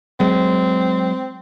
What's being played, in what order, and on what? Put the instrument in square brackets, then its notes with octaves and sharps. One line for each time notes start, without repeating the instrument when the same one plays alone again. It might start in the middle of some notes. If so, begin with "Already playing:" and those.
[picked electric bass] F#3 G#3 [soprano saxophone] C4